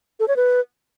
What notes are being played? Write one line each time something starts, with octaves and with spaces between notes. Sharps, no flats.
A4
C#5
B4